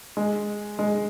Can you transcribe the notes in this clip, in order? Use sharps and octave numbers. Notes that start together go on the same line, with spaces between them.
G#3
G#3